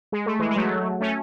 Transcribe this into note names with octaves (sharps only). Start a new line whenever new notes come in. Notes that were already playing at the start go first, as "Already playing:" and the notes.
G#3
A3
E3 G#3
G#3
F#3 A3
A3 C#4